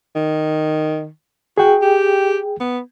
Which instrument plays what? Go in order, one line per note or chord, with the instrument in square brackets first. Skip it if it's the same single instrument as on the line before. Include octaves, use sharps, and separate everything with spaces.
[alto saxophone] D#3
[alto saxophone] F#4 [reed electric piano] G#4 G5
[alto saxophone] G4
B3